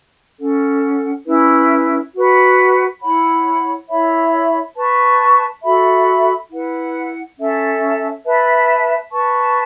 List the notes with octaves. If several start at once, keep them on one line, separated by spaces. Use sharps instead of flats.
C#4 A4 F#5
C#4 E4 B4
F#4 B4 F#5
E4 C#5 F#5 B5
E4 C#5 E5 B5
B4 A5 C#6
F#4 A4 E5 B5
E4 B4 F#5
C#4 A4 E5 A5
B4 E5 A5
B4 A5 C#6